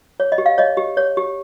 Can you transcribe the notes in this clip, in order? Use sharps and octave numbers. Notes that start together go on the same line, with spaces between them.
C#5
D#5
G4
F5
C#5 D#5
G4
C#5
G4